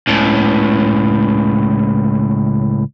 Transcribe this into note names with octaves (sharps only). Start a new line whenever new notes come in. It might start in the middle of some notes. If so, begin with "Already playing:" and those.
C#2 A2